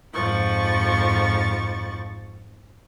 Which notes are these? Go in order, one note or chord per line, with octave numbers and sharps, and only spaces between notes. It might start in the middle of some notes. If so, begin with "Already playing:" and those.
F2 G#2 F3 C#6 A6